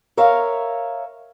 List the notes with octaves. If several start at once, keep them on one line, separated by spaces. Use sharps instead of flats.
A#4 C#5 E5 F5